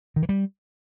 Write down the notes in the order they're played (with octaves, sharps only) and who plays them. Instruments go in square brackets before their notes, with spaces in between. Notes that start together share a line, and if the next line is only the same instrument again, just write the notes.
[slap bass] D#3
E3
G3